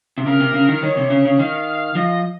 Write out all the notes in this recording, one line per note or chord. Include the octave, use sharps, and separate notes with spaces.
C3
C#3 A#4
C3
C#3
D#3
D#3 C#5
C3
C#3
C#3
D#3 F5
F3 D#5